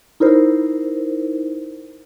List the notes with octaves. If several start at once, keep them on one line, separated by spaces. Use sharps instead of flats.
D#4 E4 A#4 C5